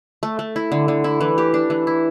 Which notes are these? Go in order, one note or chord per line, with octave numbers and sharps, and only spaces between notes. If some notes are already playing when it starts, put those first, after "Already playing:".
A3
A3
E4
D3
D3
E4
E3
G4
D4
E3
E4